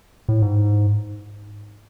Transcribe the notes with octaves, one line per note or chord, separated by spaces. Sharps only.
A2
G#2